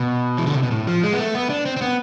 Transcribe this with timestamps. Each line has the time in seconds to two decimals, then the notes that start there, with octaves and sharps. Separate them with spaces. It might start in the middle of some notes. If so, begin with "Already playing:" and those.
Already playing: B2
0.38 E3
0.47 D3
0.55 C3
0.63 B2
0.71 A2
0.87 F3
1.03 G#3
1.13 B3
1.19 A3
1.35 B3
1.50 D4
1.66 C4
1.77 C4
1.82 B3